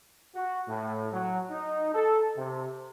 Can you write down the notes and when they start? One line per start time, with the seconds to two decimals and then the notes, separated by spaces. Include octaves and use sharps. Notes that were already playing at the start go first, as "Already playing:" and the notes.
0.35 F#4
0.68 A2
1.13 F#3
1.51 D#4
1.94 A4
2.36 C3